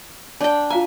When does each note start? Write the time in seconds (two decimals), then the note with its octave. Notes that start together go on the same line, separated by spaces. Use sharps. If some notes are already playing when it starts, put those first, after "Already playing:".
0.41 D4 D5 G5 A5
0.70 F4 F5 G#5 A#5